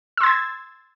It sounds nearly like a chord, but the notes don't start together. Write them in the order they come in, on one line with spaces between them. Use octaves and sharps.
E6 C6 G#6 A6